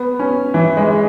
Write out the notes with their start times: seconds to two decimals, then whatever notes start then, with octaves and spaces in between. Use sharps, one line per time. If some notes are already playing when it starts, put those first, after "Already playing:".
Already playing: B3
0.19 C#4
0.54 E3
0.77 G#3